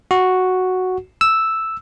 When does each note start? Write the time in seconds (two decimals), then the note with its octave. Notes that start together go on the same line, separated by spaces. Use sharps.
0.11 F#4
1.21 E6